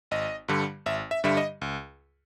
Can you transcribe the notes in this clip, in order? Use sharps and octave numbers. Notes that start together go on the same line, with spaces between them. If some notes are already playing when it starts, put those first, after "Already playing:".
G#1 D#5
G2 D3 G3
G#1 E5
E5
G2 D3 G3 E5
D#5
C#2